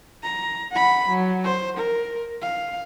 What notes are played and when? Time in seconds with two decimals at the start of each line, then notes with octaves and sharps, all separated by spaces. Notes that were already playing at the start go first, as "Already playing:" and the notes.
0.23 A#5
0.72 F#5 B5
1.09 F#3
1.44 C5
1.77 A#4
2.42 F5